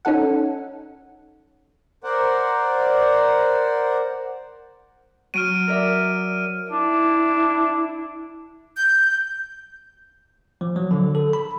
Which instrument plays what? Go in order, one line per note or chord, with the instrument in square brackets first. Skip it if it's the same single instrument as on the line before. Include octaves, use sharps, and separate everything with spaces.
[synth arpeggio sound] C#4 D#4 A4 F#5
[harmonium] A#4 C5 D5 F#5
[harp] F#3 [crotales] F6 D7 D#7
[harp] A#4 D5 E5
[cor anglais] D4 [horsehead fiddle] E4
[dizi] G6
[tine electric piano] F3
F#3
D3
A4
B5